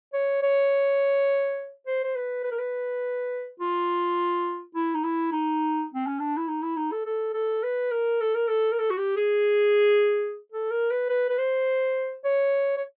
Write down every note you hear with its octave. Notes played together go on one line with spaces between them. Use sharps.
C#5
C#5
C5
C5
B4
B4
A#4
B4
F4
E4
D#4
E4
D#4
C4
C#4
D4
E4
D#4
E4
D#4
A4
A4
A4
B4
A#4
A4
A#4
A4
A#4
A4
F#4
G4
G#4
A4
A#4
B4
B4
B4
C5
C#5
C#5